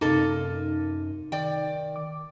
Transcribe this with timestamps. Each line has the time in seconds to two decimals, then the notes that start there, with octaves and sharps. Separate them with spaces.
0.01 F#2 C3 A#3 D#4 A4
1.32 D#3 D5 G5
1.96 D6